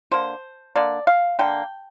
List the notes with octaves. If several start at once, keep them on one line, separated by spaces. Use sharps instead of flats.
D3 A#3 C5
D3 A#3 D5
F5
D3 A#3 G5